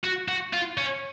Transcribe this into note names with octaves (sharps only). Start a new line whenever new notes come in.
F#4
F#4
F4
C#4